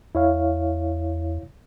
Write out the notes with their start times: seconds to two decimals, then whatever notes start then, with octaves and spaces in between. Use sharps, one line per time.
0.15 E2 E4 C#5 F5